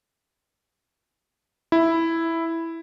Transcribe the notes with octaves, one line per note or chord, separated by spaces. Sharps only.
E4